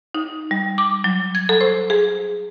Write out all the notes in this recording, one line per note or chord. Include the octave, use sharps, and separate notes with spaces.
D#4
G3
D6
F#3
G#6
A4
C5
G#4